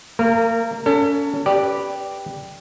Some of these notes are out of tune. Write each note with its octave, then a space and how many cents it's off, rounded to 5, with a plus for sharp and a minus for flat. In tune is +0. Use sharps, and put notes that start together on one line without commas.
A#3 -35 A#4 -10
C#4 +35 A4 +40
G4 +0 B4 -5 D5 +0